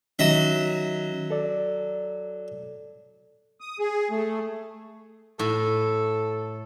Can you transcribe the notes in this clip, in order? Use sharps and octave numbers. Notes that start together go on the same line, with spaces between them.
D#3 F#3 C#4 D#5 E5
A4 D5
D#6
G#4
A3
A2 A4